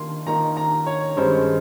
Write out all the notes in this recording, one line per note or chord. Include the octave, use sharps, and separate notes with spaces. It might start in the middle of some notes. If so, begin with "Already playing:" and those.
Already playing: D#3 A#3 C6
D#3 A#3 D#4 A#5
A#5
C#5
G2 D#3 G#3 C#4 C5